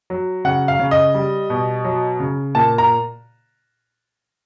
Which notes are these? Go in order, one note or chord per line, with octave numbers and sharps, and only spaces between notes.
F#3
C#3 F#5
F5
C#3
D#5
G3
B2
F#3
C#3
A#2 A5
A#5